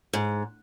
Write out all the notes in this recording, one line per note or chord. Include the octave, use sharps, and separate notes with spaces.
G#2